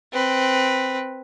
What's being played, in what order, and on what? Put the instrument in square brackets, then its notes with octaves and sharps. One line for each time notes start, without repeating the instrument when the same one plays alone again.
[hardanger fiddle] C4 B4